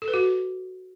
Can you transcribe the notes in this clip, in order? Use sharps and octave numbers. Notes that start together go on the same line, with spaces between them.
A4
B4
F#4